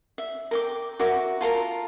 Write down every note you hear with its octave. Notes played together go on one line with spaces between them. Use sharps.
E5
A#4 G5 D6
F#4 A#4 E5 D6
F4 A4 A#4 A#5